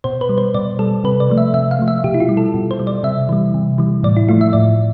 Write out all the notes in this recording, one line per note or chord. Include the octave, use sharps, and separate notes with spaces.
B2 C5
B4
G3
C5
B2 D5
G3 A4
C3 B4
D5
F3 A3
E5
C3 E5
F5
F3 A3
E5
B2 G4
E4
F4
G3
A4
B2
C5
G3
D5
C3 E5
E3 G3
C3
E3 G3
A2 D5
E4
F3 A3 F4
E5
A2 D5